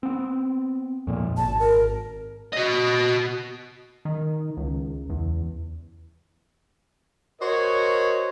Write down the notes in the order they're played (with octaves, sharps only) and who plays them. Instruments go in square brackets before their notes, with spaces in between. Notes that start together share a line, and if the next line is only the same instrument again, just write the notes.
[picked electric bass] B3 C4
F2 A#2
[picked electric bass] G#1 [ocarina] A5
[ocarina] A#4
[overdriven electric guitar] F#4 D#5
[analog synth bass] D#3
C#2
E2
[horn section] F#4 A#4 C5 C#5 D#5